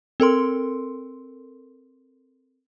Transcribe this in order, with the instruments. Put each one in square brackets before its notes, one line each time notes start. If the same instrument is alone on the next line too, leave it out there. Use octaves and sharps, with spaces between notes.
[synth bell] C4 A4 A#4 C6